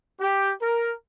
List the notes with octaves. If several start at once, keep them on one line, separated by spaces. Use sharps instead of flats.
G4
A#4